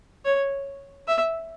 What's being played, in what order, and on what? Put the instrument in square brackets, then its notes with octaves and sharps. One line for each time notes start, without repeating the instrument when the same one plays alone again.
[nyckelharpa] C#5
E5